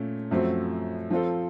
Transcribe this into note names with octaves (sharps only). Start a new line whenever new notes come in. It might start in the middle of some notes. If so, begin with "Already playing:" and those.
Already playing: A#2 A3 C#4
F#2 F3 A3 C4 F#4
F3 C4 F4 A4